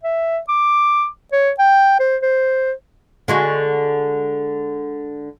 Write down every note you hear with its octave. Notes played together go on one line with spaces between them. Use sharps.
E5
D6
C#5
G5
C5
C5
D3 G#3 F#4